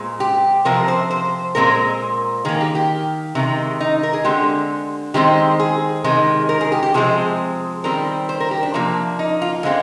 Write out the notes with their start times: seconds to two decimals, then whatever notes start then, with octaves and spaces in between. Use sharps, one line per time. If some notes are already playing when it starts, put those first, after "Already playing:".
Already playing: A#2 G#3 C4
0.20 G4
0.65 C3 F3 C4 A#4
0.88 C5
1.10 C5
1.55 A#2 G#3 C4 A#4
2.45 D#3 A#3 G#4
2.61 G4
2.75 G4
3.35 C3 D#3 G#3
3.80 D#4
4.03 A#4
4.13 G#4
4.24 D3 G#3 C4 G4
5.14 D#3 G#3 C4 G4
5.59 G#4
6.04 C3 D#3 G#3
6.49 A#4
6.61 G#4
6.72 G4
6.83 G4
6.94 C3 F3 G#3 C4 G#4
7.84 D#3 G3 C4 A#4
8.29 C5
8.40 A#4
8.51 G4
8.63 D4
8.74 C3 F3 A#3
9.19 D#4
9.42 F4
9.63 D3 G#3 C4